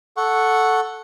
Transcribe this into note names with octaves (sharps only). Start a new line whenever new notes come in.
A4 F#5 C#6